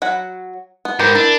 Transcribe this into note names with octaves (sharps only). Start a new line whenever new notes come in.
F#3 F#5 B5
B3
G#2 G4 A#4 B4
D4 E4